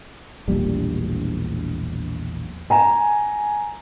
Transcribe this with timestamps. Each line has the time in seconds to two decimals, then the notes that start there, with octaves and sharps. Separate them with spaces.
0.48 E1 A#1 G3
2.70 G#5 A#5